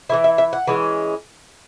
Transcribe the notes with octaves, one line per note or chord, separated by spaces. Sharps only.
E3 A#3 E4 E5
E5
E5
F#5
E3 G#3 C#4